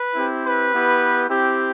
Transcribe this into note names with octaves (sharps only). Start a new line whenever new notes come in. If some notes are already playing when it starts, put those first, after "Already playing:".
Already playing: B4
C4 E4 G4
B4
B3 E4 G4
C4 E4 G4